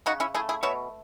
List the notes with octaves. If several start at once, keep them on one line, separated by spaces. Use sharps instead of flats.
C#3 D#4 F#4
C#4 E4
A3 E4 G#4
E4 G#4
B2 C#5 E5